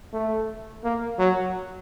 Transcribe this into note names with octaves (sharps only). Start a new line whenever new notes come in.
A3
A#3
F#3